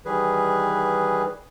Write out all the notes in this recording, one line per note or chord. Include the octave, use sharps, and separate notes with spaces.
D#3 E3 G3 G#4 B4